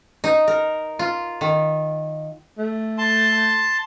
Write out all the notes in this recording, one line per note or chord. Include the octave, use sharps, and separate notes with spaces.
D#4
A#4
F4
D#3
A3
A5 C6